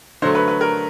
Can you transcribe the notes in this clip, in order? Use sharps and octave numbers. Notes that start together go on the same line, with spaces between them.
D3 F#3 A3 C5
B4
B4
A#4